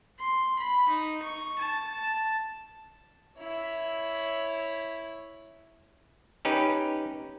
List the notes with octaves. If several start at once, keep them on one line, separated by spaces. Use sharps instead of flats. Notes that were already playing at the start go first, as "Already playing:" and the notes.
C6
B5
D#4
C#6
A5
A5
E4 C#5
C#4 D#4 G4 B4